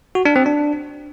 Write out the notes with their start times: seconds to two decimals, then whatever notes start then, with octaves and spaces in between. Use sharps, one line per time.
0.15 F#4
0.25 D4
0.36 C4
0.46 D4